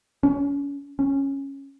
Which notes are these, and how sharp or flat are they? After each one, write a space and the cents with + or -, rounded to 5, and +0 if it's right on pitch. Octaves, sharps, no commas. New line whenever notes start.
C#4 +30
C#4 -10